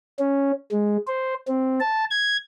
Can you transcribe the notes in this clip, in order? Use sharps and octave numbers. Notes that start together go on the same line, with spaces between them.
C#4
G#3
C5
C4
A5
G#6